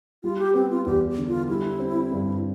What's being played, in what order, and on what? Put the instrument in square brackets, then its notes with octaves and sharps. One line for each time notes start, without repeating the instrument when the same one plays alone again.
[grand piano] G3 [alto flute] F4
[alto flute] G4
[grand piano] B3 [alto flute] C4
[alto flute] F4
[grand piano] E2 [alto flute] G4
[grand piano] D3
[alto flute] F4
[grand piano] G3 [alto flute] E4
[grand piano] C4
G2